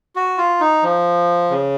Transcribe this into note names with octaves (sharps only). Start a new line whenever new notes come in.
F#4
F4
D#4
F3
C#3